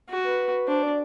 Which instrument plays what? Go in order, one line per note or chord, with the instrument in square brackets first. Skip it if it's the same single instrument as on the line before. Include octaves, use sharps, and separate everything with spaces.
[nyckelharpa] F#4
[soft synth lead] B4
[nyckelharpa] D4 [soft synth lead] C5
[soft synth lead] D5